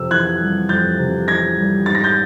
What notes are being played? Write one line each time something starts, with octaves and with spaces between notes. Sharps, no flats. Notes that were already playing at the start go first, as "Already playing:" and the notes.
Already playing: F2 C3 E6
E3 F#6 G#6
G3
F2 G6 A6
C3
E3 G#6 A#6
G3
G#2 A6
A#6
G6 A6